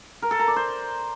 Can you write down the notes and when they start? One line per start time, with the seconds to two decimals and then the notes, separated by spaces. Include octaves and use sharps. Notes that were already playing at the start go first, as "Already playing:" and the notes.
0.22 A#4
0.31 A4
0.39 A#5
0.48 D5
0.56 C5